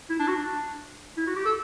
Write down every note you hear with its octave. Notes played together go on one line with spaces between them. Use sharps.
E4
D4
F#4
D4
E4
F#4
G4
A4